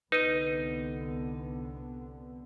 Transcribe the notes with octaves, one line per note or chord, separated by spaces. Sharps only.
C2 D3 B3 D#4 B4 D#7